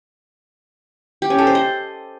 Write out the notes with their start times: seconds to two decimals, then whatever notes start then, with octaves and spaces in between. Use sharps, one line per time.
1.22 G4
1.30 C#4
1.38 A4
1.47 C5
1.55 D#5